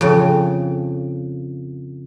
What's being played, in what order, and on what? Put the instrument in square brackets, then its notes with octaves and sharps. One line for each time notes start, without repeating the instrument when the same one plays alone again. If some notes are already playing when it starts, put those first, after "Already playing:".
[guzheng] F2 C#3